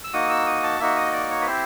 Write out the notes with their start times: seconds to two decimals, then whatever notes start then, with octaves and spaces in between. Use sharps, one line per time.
0.04 E6
0.13 A#3 D#4 F#4 D#6
0.30 E6
0.47 D#6
0.63 A5
0.80 A#3 D#4 F#4 E5
0.96 D#5
1.13 D5
1.30 C#5
1.41 B4
1.47 C4 E4 G4 C5